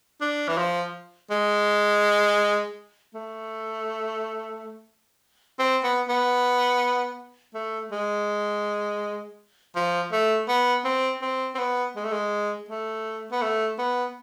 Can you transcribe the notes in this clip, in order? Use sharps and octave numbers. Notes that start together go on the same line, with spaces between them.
D4
E3
F3
G#3
A3
C4
B3
B3
A3
G#3
F3
A3
B3
C4
C4
C4
B3
G#3
A3
G#3
A3
B3
A3
B3